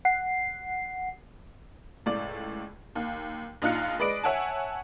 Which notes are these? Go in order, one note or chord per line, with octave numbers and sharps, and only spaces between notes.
F#5 C7
C#2 A2 D5
D#2
A#1 D#4 F4 F#6 C#7
G#3 B4 D5 D#5 D7
C#5 E5 F#5 G#5 A5